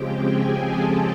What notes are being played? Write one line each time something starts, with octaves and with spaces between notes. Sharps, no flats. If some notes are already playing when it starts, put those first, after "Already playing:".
Already playing: C#3 F3 G#3 C4 G4 G5
G#4 G#5
A4 A5